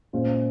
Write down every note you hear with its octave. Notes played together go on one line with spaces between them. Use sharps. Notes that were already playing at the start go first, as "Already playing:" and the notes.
A#2 G#3 C#4 F4 C5